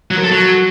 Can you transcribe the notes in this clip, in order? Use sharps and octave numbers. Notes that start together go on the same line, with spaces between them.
F#3
A#4
A4
F#3